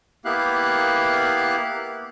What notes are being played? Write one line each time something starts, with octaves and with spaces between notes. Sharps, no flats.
A#3 B3 E4 G4 F5 F#6